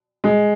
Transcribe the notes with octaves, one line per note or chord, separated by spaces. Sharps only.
G#3